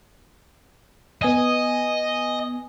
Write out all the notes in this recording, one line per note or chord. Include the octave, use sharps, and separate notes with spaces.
B3 D#5 G#5 D#6